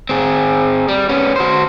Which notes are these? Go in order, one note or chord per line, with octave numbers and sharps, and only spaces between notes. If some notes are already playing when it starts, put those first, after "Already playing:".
C4 G#4
G3
B3 C#4
F#4 C5